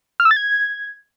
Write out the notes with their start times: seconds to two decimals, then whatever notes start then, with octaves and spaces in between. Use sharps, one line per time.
0.20 F6
0.25 E6
0.31 A6
0.36 G#6